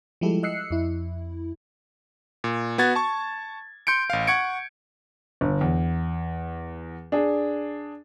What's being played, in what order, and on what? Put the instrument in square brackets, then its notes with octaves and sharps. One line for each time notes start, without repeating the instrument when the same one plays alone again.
[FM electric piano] F3 G3 G#3 E4 G4 A4
D#5 E6 F#6 C7 C#7
F2 E4
[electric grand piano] A#2
B3 F#4 G#6 A6
A5 C#6
C6 G6 C#7 D7
A1 F5
F#5 C#6 G#6 C#7 D7
[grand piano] G1
E2
D4 G#4